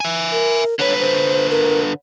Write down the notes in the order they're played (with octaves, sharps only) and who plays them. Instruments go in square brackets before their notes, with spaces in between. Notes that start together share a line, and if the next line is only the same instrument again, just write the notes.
[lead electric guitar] E5 G#5
[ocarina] A#4
[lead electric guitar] D3 B4 [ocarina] C#5
[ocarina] C5
A#4